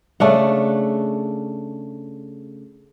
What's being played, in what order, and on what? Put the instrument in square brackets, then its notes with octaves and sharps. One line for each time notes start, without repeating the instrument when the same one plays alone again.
[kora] C#3 A3 D4 F#5